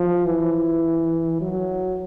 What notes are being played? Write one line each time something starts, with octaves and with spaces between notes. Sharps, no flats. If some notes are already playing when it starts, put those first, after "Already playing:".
Already playing: F3
E3
F#3